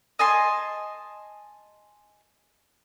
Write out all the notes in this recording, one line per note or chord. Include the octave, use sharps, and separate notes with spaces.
D#5 G#5 A5 C6